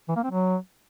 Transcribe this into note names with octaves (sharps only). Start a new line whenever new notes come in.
E3
A#3
C4
F#3